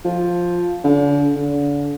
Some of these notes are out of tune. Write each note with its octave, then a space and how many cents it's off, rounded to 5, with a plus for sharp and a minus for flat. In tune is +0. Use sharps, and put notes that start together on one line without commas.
F3 +5
D3 -40
D3 -35